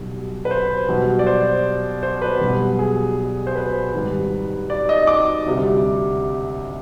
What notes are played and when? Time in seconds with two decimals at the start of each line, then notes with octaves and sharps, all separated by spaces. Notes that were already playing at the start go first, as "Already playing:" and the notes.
Already playing: B1 B2 G3
0.45 B4
0.51 C5
0.88 B1 B2 G3
1.19 D5
1.27 C5
2.03 C5
2.22 B4
2.41 B1 B2 G3
2.79 G#4
3.47 C5
3.55 B4
3.94 G#1 G#2 D#3 G3
4.70 D5
4.89 D#5
5.07 D6
5.46 D2 C3 G3